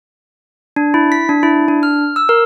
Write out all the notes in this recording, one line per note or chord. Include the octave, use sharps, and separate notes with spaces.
D4
E4
B6
D4
E4
D4
F6
E6
A#4